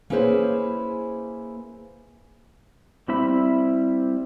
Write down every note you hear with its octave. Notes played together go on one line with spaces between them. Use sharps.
A#3 C#4 E4 G#4 B4 C5
G3 C4 E4 E5 B5